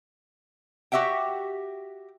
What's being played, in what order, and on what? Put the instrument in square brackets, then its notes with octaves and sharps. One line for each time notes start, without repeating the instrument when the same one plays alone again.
[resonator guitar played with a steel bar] F#4 G4 E5 F#5 G5